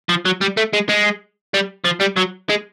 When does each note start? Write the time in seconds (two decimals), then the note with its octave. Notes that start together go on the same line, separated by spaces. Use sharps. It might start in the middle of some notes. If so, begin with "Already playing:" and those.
0.09 F3
0.25 F#3
0.41 G3
0.57 A3
0.73 G#3
0.89 G#3
1.54 G3
1.85 F3
2.01 G3
2.17 F#3
2.50 G#3